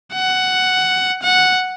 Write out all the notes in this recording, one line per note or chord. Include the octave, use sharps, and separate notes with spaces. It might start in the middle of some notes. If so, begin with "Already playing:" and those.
F#5
F#5